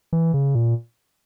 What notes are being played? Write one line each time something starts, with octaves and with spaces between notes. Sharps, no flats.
E3
C#3
A#2